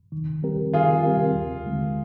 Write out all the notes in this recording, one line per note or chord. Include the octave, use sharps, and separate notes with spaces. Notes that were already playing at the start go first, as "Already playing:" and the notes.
D#3
G3 C4 G4 A#4
D#3 F4 G#4
G3 C4 G4 A#4
D#2
D3 G#3